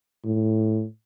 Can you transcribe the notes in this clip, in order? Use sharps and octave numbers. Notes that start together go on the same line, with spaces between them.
A2